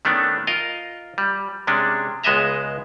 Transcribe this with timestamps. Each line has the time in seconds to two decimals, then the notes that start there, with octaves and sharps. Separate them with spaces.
0.05 D#3 A3 B3 C#4 D4
0.47 F4 A#4 D#5
1.18 G3
1.67 C3 G#3 C#4 D4
2.23 C#2 G#3 B3 D#5 E5 A#5